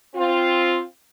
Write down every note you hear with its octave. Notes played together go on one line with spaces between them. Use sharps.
C4 F4